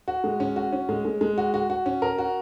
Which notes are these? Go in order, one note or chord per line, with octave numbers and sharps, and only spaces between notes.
F#4
G#3
C#4
F#4
C#4
G#3
G#3
G#3
F#4
F#4
F#4
C#4
A#4
F#4